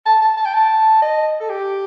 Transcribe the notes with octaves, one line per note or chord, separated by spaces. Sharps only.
A5
A5
A5
G5
A5
D#5
A4
G4